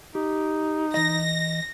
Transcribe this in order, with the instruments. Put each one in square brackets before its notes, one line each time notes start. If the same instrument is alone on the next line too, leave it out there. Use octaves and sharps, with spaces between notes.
[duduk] D#4 [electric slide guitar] G4
[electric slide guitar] E3 D#5 [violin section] A#6